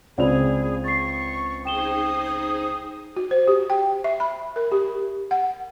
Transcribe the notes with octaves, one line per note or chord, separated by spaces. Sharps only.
C#2 C4 G#4 D5 B5 F7
C#6 A6 C7
D#4 G#4 C5 G5 D#6 E7 G7
F#4
C5
G4
G5
E5
B5
A#4
G4
F#5